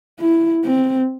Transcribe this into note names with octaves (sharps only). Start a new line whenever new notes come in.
E4
C4